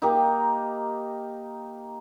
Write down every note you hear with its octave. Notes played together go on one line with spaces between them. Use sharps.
A#3 D#4 G4 A#4